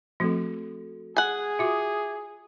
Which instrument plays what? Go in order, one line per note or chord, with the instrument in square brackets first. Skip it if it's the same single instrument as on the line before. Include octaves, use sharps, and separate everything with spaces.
[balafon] F3 A3 C4 [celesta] F#4 A4
[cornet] G#4 [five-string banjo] F#5 G#5
[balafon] F4 F#4 [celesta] E5 D6 D#6